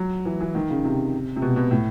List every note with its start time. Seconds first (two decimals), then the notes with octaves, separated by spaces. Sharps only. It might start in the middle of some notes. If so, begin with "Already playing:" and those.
Already playing: F#3
0.25 E3
0.41 E3
0.55 D#3
0.70 C#3
0.84 C3
1.36 C3
1.42 B2
1.56 B2
1.71 A2